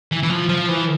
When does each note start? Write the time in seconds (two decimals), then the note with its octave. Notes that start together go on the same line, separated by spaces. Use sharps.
0.12 E3
0.23 E3
0.30 F3
0.49 F3
0.68 E3